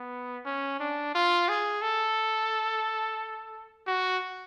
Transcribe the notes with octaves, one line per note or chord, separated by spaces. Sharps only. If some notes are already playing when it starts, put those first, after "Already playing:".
Already playing: B3
C#4
D4
F4
G#4
A4
F#4